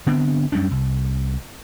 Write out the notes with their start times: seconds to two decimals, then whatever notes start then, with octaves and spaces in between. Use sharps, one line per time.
0.06 D3 B3 C4 D4
0.52 F#2 G3 C#4 D4
0.71 C2